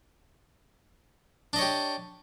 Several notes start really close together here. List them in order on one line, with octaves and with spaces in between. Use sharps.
D4 D#5 C#5 G4